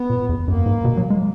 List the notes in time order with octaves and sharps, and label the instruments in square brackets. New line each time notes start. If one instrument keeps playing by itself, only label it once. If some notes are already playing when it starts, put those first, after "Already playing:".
Already playing: [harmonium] B3
[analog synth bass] A#2
E2
[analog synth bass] F#2 [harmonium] A#3
[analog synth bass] G#2
B2
F#3
G#3